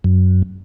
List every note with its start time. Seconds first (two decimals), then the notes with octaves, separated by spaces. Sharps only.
0.04 F#2